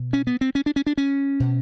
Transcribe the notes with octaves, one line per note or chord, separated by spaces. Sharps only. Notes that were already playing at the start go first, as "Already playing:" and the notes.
Already playing: B2
C#4
B3
C4
C#4
D4
C#4
D4
C#4
B2